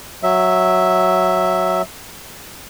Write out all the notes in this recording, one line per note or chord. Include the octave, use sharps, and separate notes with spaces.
F#3 E5